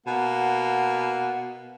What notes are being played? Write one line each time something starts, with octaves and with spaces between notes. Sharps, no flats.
B2 A#3 F#5